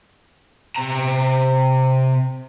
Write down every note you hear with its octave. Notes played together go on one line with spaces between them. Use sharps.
C3 A#5